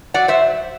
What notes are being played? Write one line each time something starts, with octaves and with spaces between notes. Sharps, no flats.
F#3 D5 F#5
F#3 C5 E5